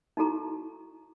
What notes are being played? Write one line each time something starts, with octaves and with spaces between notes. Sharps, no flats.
D#4 E4 F#4 A4 A#5 C#6